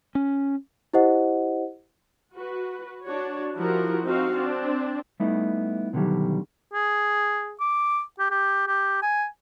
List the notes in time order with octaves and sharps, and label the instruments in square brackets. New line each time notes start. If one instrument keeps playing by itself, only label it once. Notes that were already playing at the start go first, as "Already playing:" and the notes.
[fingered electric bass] C#4
[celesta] E4 G4 C5 D#5 F#5
[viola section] F#4 B4
D4 F#4 C#5
F3 E4 F#4 G4 A#4
C4 D#4 F#4 F5
C4 D4
[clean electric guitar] G3 A3 B3 D#4 E4
B2 D3 D#3 F#3 G3
[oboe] G#4
D6
G4
G4
G4
G#5